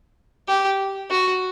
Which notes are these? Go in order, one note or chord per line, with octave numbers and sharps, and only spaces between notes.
G4
F#4